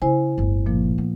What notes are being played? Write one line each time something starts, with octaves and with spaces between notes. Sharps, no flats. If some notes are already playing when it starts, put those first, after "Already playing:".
C#3 E4 C5 G#5
D1 G1
A#2 F3 A#3
B3